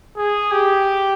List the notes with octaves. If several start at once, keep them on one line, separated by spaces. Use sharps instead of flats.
G#4
G4